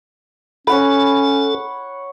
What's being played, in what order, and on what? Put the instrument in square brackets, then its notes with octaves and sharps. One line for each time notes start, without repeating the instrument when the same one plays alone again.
[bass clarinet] C#4 [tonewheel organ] A4 [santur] C#5 F#5 B5